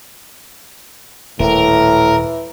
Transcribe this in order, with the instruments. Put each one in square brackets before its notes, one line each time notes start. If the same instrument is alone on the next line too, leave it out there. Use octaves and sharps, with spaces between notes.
[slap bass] D#1 [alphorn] A2 [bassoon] E3 [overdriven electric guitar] A#4